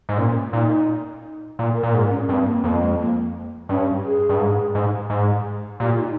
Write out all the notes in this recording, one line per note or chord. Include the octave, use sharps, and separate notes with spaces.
G#2
A#2 C#4
A#2 D#4
A#2
A#4
A#2
G#2 A#4
C#4
G2 C4
A#3
F2 A#3
G#3
A#3
G2 C#4
G#4
G2
G#2
G#2
G#2
A#2 G4
F4
D#4